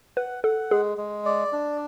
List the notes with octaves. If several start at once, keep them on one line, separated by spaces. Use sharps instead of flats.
B4 F#5
A4 F#5
G#3 G#4
G#3
D5
D4